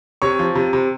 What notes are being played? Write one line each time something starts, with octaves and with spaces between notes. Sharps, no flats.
C3 C#5 C#6
F3
C3
C3